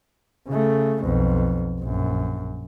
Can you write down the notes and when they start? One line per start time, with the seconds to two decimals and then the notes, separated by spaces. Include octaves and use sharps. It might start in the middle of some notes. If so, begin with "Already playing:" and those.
0.48 C#3 A3
1.03 B1 F2
1.81 A#1 F#2